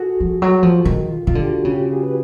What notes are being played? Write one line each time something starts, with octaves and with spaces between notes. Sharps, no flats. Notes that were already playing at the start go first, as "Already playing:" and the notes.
Already playing: F#4 G#4 A4
F3
F#3
F3
D#3
F4
D#3 F4
D3 G4
F#4
C#3
G4
G#4
B4